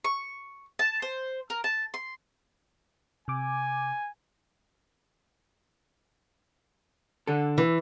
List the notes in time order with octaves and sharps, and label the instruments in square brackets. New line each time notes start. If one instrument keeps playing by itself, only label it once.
[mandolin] C#6
A5
C5
A#4
A5
C6
[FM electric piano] C3 D6 [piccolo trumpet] G#5
[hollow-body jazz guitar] D3 A4
[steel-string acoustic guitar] E3